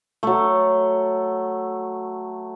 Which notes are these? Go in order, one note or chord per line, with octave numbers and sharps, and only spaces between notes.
F#3 A3